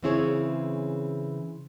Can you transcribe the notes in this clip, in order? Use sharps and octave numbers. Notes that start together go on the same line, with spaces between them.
C#3 E3 C4 E4 G#4 C#5